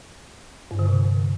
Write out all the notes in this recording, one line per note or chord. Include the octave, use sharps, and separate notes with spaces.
G2
D3
C3